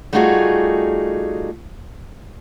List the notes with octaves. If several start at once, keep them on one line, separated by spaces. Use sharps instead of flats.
G3 A3 D#4 F4 F#4 G#4